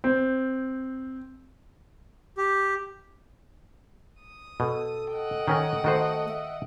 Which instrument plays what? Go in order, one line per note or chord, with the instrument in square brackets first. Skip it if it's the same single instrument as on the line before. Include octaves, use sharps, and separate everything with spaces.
[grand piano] C4
[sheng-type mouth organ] G4
[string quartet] D#6
[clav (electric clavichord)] B2 [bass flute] A4
[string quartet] D#5 F#5 G5
[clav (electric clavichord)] D#3 C#4 A#4
[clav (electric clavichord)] D#3 F#4 C5 [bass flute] A3
[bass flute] E5